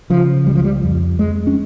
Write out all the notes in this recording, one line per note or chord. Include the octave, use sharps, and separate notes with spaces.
C#3 F3
C#2 G3
F3
G3
F2
F2 G#3
C#4